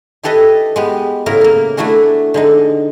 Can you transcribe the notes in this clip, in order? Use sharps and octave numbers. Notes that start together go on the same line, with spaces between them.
E4 G4 A4 B4 D#5
G#3 B3 G4
A2 C#3 E4 A#4
A#3 A#4
A3 D4 E4 F#4 G#4
D3 G#3 D#4